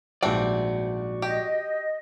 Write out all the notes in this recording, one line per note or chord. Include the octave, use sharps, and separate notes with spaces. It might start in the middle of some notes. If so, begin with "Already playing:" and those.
A#1 G#2 E3 G3 C4 D4 F#4 D5
G4 D#5